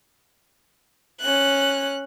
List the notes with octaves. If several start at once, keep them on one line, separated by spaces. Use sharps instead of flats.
C#4 F#6